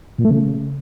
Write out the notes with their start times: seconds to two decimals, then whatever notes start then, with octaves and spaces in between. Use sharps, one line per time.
0.18 A#2
0.25 A3
0.31 C#3